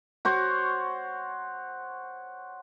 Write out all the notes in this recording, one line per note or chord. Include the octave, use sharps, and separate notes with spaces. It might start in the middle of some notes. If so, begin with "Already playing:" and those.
F#4 C5 C#5